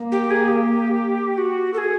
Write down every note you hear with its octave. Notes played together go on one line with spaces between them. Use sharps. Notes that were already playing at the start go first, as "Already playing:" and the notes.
Already playing: A#3
G4
G#4
G4
F#4
A4
G#4